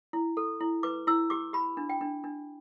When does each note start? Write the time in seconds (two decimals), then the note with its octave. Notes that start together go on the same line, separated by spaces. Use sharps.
0.13 E4
0.37 A4
0.61 E4
0.83 B4 D6
1.07 E4 E6
1.30 G4 D6
1.53 G4 B5
1.77 D4
1.90 G5
2.01 D4
2.24 D4